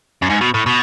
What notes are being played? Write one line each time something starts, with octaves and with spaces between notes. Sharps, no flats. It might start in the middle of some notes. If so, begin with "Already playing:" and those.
F#2
G#2
B2
A2
B2